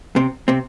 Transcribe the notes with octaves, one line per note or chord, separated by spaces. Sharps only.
C3 C4
C3 C4